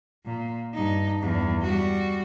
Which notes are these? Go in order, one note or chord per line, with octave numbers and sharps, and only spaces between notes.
A#2
G2 D#4
E2 G2
G3 F#4